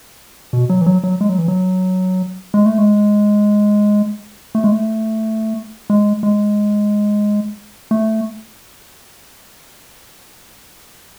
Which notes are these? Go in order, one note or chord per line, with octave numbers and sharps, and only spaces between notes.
B2
F#3
E3
F#3
F#3
G#3
F#3
E3
F#3
G#3
A3
G#3
A3
G#3
A3
G#3
G#3
A3